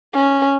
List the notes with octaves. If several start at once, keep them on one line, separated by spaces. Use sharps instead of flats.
C#4